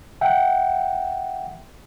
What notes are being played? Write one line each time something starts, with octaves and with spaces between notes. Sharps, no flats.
E5 F#5 G5